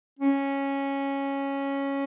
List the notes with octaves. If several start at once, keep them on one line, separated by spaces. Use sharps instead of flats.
C#4